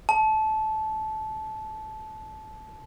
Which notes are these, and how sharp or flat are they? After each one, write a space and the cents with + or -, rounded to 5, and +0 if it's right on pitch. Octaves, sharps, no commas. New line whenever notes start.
A5 -20